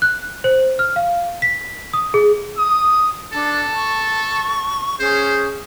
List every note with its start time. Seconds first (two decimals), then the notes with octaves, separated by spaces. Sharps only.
0.02 F#6
0.44 C5
0.79 F6
0.96 F5
1.42 B6
1.93 D#6
2.14 G#4
2.57 D#6
3.33 D4 A4 A5
3.75 C#6
5.00 C#4 G#4 C5